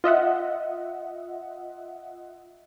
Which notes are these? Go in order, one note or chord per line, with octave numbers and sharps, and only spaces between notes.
F4 D#5 E5 F#5